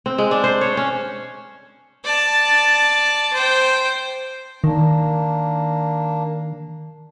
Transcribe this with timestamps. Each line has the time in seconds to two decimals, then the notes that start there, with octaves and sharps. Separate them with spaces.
0.06 C4
0.18 G#3
0.31 D4
0.44 C5
0.61 C#5
0.77 C#4
2.04 D5 A5
3.33 C5 G5
4.64 D#3 A#3 D4